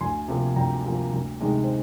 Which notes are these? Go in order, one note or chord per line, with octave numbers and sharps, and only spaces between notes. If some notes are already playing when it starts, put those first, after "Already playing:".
D2 G#5 C6
C3 F3 A#3
D2 G5 A#5
C3 F3 A#3
D2
C3 D#3 G#3
C5